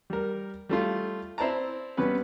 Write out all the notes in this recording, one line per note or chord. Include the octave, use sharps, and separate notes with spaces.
G3 A#4
G3 A3 F4
C4 E4 C5 D5 A5 A#5
C3 G3 B3 C#4 B4